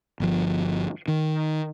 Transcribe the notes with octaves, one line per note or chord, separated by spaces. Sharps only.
G1 F3
D#3